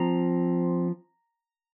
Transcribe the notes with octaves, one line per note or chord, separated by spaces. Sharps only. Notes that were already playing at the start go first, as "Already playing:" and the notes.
Already playing: F3 C4 A#5